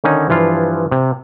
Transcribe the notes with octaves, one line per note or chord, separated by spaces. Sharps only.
D3 D#3 C#4 D#4
G2 E3 F3 F4
C3